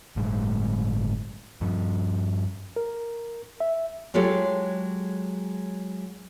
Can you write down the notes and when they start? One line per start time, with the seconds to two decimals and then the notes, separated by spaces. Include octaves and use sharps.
0.16 G1 A2 F#3 G#3
1.61 G2 F3
2.76 A#4
3.60 E5
4.14 F#3 G#3 F4 G4 A4 C#5